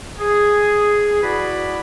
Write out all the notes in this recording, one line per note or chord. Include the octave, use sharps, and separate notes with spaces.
G#4
E4 F#4 B4 D5 F#5 B5